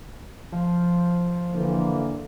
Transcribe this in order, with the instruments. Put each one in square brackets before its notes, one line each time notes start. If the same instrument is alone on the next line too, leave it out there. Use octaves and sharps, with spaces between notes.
[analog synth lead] F3
[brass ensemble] D3 E3 A#3